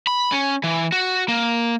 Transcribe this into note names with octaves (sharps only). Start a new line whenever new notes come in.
B5
C#4
E3
F#4
A#3